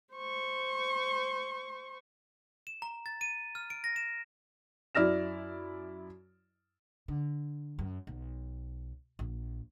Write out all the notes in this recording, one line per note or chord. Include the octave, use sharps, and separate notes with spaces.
C5 C#6
E7
A#5
A6
D#7
F6
D7
A#6
E7
F#2 E4 D5 F6 A#6 E7
D3
F#2
B1
A#1